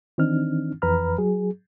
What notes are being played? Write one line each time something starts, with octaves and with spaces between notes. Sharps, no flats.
D#3 E3 C4 D4 D#4 F6
F2 E3 B4 A#5 B5 F6
F#3 G#4